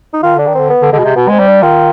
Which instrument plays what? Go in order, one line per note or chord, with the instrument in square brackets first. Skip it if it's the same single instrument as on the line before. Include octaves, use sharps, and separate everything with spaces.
[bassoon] D#4
[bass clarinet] D#3 [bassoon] F4
[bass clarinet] D3 [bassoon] D4
[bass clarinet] D#3
[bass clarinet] D3 [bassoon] C4
[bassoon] B3
[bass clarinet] D3
[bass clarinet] D3 [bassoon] G#3
[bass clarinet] B2
C3
[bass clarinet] B2 [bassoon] B3
[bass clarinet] G#3 [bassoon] C4
[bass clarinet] G3
[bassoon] D4
[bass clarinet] D#3 [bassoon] F4